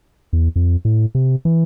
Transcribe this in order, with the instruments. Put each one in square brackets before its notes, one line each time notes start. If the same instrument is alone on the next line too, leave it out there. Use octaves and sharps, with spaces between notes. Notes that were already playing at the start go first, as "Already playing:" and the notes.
[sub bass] E2
F2
A2
C3
E3